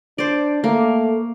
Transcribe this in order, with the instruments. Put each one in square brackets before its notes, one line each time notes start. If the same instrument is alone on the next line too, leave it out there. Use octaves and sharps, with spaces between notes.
[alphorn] D4 [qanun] C5 D5
[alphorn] A3 [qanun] A#3